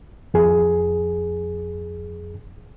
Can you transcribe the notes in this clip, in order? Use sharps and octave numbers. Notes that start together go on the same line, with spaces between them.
F2 G#4